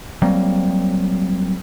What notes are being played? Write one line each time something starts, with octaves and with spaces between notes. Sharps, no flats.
F#3 G3 A#3 C4